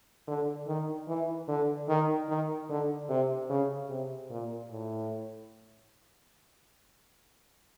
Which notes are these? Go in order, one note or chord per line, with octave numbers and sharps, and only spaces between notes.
D3
D#3
E3
D3
D#3
D#3
D3
C3
C#3
C3
A#2
A2